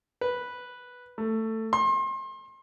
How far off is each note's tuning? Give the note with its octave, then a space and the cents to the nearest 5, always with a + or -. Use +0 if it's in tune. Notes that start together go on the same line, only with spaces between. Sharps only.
B4 -5
A3 +15
C6 +35